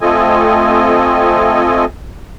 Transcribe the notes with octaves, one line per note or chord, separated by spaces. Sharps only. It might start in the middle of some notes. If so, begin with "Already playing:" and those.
A3 C4 F4 A4 D#5 G#5